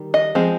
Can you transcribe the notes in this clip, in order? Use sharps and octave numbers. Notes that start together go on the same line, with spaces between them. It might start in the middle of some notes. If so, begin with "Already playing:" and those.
Already playing: D#3 G3
D#5
F3 G#3 C4